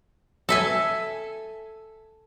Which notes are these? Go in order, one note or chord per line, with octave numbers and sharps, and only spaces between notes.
A4 E5 G#5